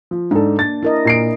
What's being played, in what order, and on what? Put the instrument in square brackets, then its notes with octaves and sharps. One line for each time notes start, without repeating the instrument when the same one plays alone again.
[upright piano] F3
[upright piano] G#2 A4 [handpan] D4
[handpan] A#3 [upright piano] A6
[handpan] E4 A#4 D#5
[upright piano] A#2 C7 D7